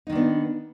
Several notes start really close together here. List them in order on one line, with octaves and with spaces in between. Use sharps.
D#4 D#3 D4 B3